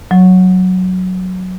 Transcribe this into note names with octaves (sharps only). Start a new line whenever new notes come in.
F#3